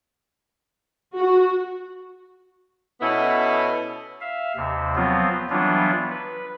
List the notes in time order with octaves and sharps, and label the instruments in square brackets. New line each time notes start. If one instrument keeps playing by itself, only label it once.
[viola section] F#4
[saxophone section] B2 B3 C#4 E4 A4
[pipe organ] E5 F5
D#2 C3
F3 F#3 B3 C4 F4
E3 F#3 G3 B3 D4 F4
B4